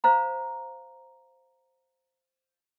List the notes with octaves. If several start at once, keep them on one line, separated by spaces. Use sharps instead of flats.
C5 F5 A#5